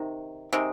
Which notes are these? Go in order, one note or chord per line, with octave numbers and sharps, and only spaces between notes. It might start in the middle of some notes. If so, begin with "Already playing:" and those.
Already playing: C3 D#3
C3 D#3 G#3